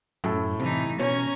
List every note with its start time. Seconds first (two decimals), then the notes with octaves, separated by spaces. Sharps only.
0.24 F#2 A2 A4
0.60 C3 E3 D#4
1.00 B2 C#4 C#5 A#5 G#6